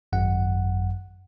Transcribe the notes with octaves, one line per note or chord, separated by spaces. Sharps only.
G#1 F#2 F#5